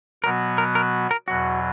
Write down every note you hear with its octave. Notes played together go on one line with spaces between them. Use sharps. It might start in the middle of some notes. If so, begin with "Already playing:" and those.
B2 F#3 B3 F#4 A#4
A#4
A#4
A#4
E2 B2 F#3 F#4